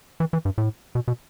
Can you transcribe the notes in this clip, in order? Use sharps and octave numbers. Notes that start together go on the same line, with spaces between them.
E3
E3
G2
A2
B2
B2